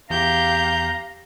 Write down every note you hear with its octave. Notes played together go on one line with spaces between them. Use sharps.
E2 G4 F5 A#5 G6